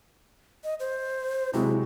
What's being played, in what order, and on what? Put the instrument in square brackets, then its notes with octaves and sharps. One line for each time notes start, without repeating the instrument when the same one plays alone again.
[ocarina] D#5
C5
[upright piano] C3 F#3 G#3 [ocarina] E4